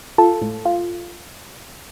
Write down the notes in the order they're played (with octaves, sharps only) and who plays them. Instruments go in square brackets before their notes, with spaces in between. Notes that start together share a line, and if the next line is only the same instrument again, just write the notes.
[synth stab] F4 A4
A2
F4